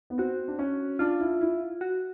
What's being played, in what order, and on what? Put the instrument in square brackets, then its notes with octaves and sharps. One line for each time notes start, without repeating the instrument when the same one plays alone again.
[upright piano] B3
[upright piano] C4 [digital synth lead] F#4
[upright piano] D4
C#4
[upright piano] D4 [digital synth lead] F4
[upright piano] E4
E4
[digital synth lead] F#4